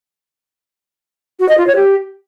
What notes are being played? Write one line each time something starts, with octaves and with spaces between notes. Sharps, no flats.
F#4
D#5
F4
C#5
G4